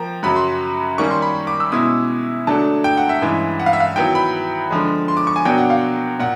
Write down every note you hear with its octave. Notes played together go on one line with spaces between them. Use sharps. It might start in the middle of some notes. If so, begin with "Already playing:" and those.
Already playing: F3 A#3 G5 A#5
F#2 C#3 F#3 B5
C6
D#3 G3 A#3 C#4 C#6
C6
B5
D6
E6
B2 G#3 C#4 E4 D#6
D3 F#3 A3 D4 A5
G5
F#5
E5
G2 E3 G#3 C#4 E4
F#5
F5
E5
F5
D#3 F#3 B3 E4 G5
B5
D3 F3 G#3
C6
D6
C#6
G#5
B2 F#3 A#3 D4 G5
F#5
F5
A#2 F#5